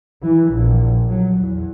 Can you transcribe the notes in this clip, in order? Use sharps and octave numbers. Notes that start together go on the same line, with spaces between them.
E3
A#1
F#3
E2